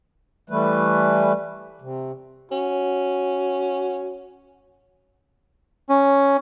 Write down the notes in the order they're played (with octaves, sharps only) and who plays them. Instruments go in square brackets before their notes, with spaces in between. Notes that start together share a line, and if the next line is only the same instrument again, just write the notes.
[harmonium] E3 G3 A3 B4
C3
[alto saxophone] C#4 [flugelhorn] F#4
[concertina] C#4